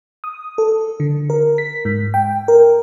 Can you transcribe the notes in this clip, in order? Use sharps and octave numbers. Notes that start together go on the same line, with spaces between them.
D#6
A4
D3
A#4
B6
G#2
G5
A#4